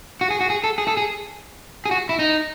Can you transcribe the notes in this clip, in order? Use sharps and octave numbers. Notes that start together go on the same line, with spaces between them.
F#4
G#4
F#4
G#4
A4
G#4
A4
G#4
G#4
F#4
E4
D#4